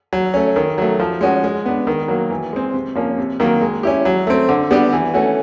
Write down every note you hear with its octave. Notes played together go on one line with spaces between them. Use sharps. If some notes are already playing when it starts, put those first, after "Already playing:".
F#3
A3 C#4
D#3
F#3 A3
F3
G#3 C#4 F#4
G#3
B3 D4
D#3
F#3 A#3
E3
G#3 C4
C3
F3 A#3 C#4
C3
D#3 F#3 A#3
G#3
C#4 E4 G4
F#3
A3 C4
D3
G3 B3 D4 G4
E3
A3 C#4 F#4